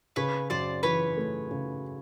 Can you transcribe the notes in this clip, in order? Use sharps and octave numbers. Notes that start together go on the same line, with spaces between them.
C#3 B4 C#5
F#2 C5 D5
E3 B4 C#5
A3
C#3